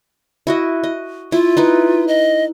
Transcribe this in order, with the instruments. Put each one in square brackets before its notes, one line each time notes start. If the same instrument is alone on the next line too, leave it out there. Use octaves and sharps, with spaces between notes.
[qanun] E4 F#4 D#5
D#5
[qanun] E4 [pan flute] F4
[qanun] D#4 E4 B4
[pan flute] D#5